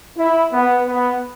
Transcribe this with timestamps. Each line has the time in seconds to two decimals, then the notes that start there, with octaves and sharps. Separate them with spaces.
0.17 E4
0.52 B3
0.87 B3